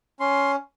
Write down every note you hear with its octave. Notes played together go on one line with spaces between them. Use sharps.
C#4 C6